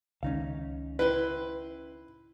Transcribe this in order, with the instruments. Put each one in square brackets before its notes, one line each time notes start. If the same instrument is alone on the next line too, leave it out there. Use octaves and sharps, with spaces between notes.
[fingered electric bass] C#2 D#3 [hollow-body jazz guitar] C#4 D#4 F5
[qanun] E4 G5 C6 [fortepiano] B4